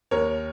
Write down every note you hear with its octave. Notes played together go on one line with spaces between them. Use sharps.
D#2 A#4 C#5